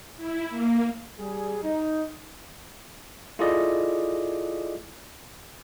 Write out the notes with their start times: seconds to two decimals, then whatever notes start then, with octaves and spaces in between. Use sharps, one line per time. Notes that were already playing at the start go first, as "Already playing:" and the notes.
0.17 E4
0.50 A#3
1.19 G3 G#4
1.64 D#4
3.39 E4 F4 G#4 A4 D5 D#5